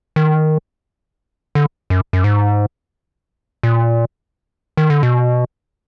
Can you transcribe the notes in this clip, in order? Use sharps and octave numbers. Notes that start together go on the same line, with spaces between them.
D#3
D3
F#2
F#2
G#2
A#2
D#3
D3
B2